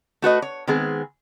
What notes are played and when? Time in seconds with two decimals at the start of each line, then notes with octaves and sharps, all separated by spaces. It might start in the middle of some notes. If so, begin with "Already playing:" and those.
0.22 A3 F#4 B4 D#5
0.42 C#5
0.67 D#3 G#3 B3 C4 G#4